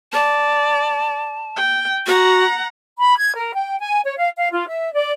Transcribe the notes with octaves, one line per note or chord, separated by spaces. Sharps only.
D5 A5
G5
F#4 F#5 A#5
B5
G#6
A#4
G5
G#5
C#5
F5
F5
F4
E5
D5